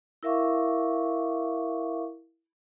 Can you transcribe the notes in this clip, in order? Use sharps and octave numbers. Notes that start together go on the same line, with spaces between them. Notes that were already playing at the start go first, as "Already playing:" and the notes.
E4 A#4 E5 F5 C#6 D6